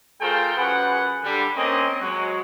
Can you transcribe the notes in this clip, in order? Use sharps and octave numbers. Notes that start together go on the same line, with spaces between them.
A3 F4 G#4 A#4 C5 G5
F#2 G#4 B4 F#5
D3 G3
A#3 C4 C#4 D#5
F#3 G#3